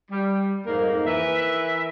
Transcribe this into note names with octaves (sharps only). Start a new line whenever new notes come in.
G3
F2 G#2 D#3 A#3
E3 A#4 B4 E5